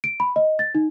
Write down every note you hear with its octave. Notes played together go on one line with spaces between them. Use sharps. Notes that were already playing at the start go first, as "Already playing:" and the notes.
D7
B5
D#5
A6
D#4